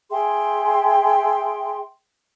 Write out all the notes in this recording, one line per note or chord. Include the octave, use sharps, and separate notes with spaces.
G#4 E5 G5 C6